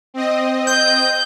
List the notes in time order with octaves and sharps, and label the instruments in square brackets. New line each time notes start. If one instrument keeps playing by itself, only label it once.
[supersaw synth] C4 D#5
[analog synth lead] G6